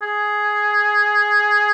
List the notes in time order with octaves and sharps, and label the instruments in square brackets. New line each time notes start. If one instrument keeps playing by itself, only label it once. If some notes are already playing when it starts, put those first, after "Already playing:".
[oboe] G#4